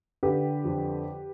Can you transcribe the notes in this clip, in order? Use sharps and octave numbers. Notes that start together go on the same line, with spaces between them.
D3 G4 B4
F2